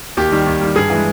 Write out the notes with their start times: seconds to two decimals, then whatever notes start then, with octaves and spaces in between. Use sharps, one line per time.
0.17 D#2 G4
0.32 D#3 G3
0.46 D#2
0.61 D#3 G3
0.76 G2 G#4
0.90 E3 G#3